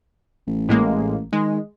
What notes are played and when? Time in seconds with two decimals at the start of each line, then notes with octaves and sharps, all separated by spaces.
0.47 A1
0.69 A2 G#3 A#3
1.33 D#3 G#3